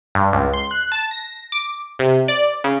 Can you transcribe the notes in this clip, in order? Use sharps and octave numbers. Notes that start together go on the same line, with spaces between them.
G2
C#2
C6
F#6
A5
A#6
D6
C3
D5
C#3